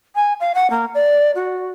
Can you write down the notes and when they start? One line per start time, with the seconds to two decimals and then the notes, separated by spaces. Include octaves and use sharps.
0.15 G#5
0.40 F5
0.55 F#5
0.70 A#3
0.94 D5
1.35 F#4